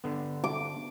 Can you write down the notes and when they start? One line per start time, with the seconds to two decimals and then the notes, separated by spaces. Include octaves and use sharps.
0.04 D3 B3
0.44 D6